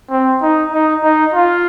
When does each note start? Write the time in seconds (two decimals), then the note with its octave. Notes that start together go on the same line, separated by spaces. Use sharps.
0.11 C4
0.42 D#4
0.73 D#4
1.04 D#4
1.34 F4